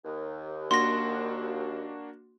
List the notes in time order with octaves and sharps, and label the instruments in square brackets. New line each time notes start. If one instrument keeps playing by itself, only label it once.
[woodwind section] D#2
[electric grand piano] A#3 D4 F#4 [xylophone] C6 A#6